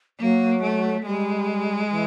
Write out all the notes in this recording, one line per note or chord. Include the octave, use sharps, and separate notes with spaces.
F#3 A#3
A3
G3 G#3
E3